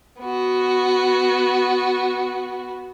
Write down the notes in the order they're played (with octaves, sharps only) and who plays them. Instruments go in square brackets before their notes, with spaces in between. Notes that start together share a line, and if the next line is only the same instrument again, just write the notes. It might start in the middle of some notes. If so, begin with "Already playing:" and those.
[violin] B3 F#4